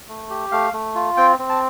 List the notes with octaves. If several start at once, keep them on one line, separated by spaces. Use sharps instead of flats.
A3
G4
A3 F5
A3
F4
C4 G5
C4
A5